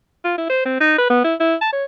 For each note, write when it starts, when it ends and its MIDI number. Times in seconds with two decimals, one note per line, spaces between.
0.24 0.34 65
0.38 0.46 64
0.50 0.62 72
0.65 0.79 60
0.81 0.94 63
0.98 1.09 71
1.10 1.19 59
1.24 1.35 64
1.40 1.55 64
1.61 1.71 81
1.73 1.84 73